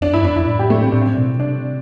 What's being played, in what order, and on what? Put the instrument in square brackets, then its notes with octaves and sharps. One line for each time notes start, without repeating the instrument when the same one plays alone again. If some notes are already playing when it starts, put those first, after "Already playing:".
[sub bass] F2 [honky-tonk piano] D4
[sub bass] G2 [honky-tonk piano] E4
[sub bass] F2 [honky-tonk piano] D4
[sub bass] F2 [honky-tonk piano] E4
[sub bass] A2
[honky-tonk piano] G4
A3
C4
[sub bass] A2 [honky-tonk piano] D4
[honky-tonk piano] C4
[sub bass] B2
[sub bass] C3 [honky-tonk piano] D4